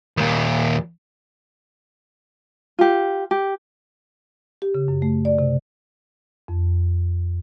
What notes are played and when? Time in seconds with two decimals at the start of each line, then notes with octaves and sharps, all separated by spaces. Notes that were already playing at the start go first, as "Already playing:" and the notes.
0.17 D#2 A#2
2.79 F4 G4
3.31 G4
4.62 G4
4.75 C#3
4.88 F#2
5.02 A3
5.25 D5
5.39 C3
6.48 F2